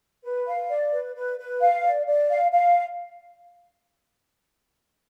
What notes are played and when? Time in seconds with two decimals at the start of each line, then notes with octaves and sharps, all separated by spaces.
0.23 B4
0.47 F5
0.69 D5
0.92 B4
1.15 B4
1.38 B4
1.60 F5
1.83 D5
2.06 D5
2.29 F5
2.51 F5